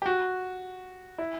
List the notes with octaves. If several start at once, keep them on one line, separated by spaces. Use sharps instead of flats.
G4
F#4
E4